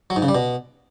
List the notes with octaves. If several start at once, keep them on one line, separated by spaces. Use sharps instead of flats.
F#3
G#2
C#3
G3
B2